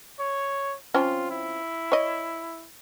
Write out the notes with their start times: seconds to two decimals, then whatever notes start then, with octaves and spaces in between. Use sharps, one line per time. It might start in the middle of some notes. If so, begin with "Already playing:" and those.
0.20 C#5
0.94 F3 C4 C#4 F4
1.31 E4
1.92 C#5 D#5